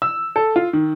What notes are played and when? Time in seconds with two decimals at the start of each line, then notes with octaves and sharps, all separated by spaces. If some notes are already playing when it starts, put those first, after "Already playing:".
0.02 E6
0.36 A4
0.56 F4
0.73 D#3